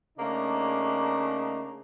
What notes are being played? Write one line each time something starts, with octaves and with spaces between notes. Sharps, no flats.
C#3 A3 A#3 D4 D#4